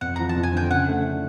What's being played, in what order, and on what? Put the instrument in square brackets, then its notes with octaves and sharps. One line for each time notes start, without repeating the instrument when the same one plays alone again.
[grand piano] F2 [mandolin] F#5
[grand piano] F3 [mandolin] A#5
[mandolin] A5
[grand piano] F2
[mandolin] G#5
[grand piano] D3 [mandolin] G5
[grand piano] C#3 [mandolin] F#5
[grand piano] A3
D4